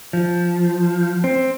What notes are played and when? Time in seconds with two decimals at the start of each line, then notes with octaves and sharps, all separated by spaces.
0.13 F3
1.24 C4